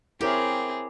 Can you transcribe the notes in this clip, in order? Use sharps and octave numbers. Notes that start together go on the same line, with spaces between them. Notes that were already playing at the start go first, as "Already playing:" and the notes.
C4 E4 G4 G#4 A#4 C#5